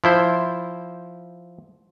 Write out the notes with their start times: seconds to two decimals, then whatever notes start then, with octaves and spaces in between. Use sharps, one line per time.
0.04 F3 E4 C5